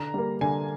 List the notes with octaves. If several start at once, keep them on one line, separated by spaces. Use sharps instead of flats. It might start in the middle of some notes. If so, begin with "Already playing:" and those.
Already playing: D3 A#5
G3 A#3
D3 G#5